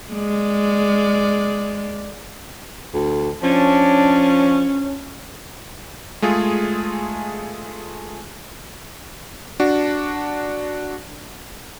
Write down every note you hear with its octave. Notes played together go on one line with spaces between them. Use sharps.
G#3 D5
D2
F3 C#4 D4
G#3 A3 F4 G#4
D4 F#4